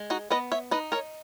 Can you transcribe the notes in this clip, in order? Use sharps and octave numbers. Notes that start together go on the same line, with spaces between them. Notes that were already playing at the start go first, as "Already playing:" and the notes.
Already playing: G#3
D#4 F#4
B3 B4 D#5
C#5 E5
D#4 B4 D#5
A#4 C#5